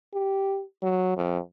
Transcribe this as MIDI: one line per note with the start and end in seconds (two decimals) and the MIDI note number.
0.13 0.62 67
0.83 1.15 54
1.17 1.38 41